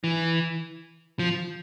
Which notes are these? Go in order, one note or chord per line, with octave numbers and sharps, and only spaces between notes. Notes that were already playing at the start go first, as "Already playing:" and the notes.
E3
F3